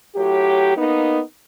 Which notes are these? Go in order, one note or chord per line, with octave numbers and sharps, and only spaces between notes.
A2 F#3 G4
A#3 B3 D#4